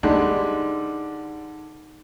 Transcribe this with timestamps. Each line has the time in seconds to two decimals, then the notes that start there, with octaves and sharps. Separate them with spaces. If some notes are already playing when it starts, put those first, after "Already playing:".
0.03 D3 G3 G#3 D#4